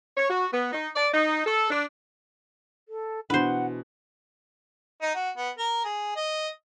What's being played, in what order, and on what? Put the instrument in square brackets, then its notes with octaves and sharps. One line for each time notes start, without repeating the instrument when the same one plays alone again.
[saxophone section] C#5
F#4
B3
D#4
D5
D#4
A4
D4
[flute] A4
[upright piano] B2 E3 [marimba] D4 [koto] B4 C5 [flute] F#5
[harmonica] D#4
F#4
B3
A#4
G#4
D#5